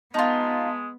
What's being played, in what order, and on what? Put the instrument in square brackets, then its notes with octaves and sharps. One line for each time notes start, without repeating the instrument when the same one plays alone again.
[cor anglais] G#3 [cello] B3 [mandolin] D#4 F4 [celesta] D#5 A5 C6